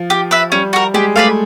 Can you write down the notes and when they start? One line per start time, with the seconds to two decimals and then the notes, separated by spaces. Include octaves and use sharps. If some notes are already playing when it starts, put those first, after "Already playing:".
Already playing: F3
0.10 G4
0.31 B4 E5
0.52 G3 C#4
0.73 F#4 A#4
0.94 G#3 G4
1.15 A3 B4 D5 F5